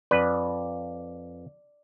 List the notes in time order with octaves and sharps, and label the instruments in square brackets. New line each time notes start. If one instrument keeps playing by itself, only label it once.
[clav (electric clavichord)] F2 B4 [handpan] D5